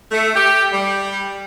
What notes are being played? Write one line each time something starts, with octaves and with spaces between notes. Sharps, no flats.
A3
G4
G3